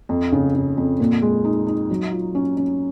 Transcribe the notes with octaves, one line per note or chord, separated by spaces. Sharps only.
F2
C#3
C#3
F2
A#2
G#3
D#4
D#4
F#3
F4
C#4
C#4